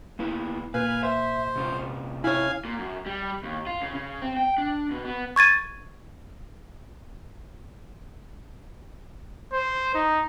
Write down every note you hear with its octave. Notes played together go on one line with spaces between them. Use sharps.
A#3 B3 E4
A#2 B4 F5 G#5
C5 E5
C3 C#4 F4
E4 C#5 F5 G#5
A#2
F#2
G3
D#2
F4
C#3
C#3
C4
G5
D4
B2
B3
C#6 G#6 A6 D#7
C5
D#4